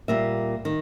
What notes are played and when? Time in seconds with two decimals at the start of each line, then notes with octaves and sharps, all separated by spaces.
0.08 A#2 G3 A#3 E5
0.65 D#3